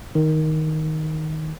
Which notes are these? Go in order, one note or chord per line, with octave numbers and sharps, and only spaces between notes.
D#3